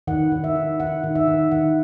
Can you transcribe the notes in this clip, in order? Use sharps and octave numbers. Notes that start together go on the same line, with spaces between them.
D#3 F#5
D#3
E5
D#3
D#3 F#5
D#3
E5
D#3
D#3 F#5